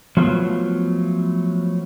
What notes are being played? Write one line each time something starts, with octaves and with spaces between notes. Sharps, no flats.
F3 F#3 A3 B3 F4